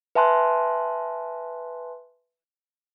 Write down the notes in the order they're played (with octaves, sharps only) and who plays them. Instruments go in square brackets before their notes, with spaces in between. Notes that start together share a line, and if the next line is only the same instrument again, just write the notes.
[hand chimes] B4 E5 G#5 A5 C6 F#6